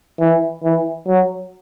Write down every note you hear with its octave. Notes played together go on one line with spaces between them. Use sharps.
E3
E3
F#3